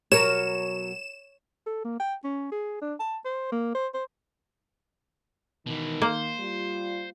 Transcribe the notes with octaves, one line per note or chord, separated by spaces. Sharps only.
B2 F#3 A#4 C#5 E7
A4
A#3
G5
C#4
G#4
D4
A5
C5
A#3
C5
C5
B2 D#3 E3
A#3 C5
G3 F4